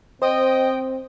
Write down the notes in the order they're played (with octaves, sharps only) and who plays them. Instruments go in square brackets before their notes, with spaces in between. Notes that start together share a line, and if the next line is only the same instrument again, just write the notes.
[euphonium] C4 [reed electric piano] C5 [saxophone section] D#5 [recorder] G5